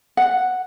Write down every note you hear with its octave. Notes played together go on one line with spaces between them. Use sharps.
F#5